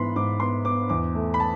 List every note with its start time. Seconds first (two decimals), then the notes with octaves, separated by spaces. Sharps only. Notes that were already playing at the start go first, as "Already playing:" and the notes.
Already playing: G#2 E3 B3 B5 C6
0.16 G#2 D6
0.40 B3 C6
0.65 B3 D6
0.89 E2 D6
1.15 A3
1.34 B5
1.40 A5